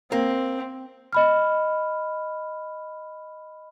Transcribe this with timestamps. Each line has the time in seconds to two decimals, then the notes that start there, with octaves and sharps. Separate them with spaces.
0.12 A#3 C4
1.13 D#5 B5 F6